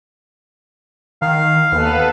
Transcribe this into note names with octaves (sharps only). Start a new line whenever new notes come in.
D#3 F5
D#2 B3 A4 B4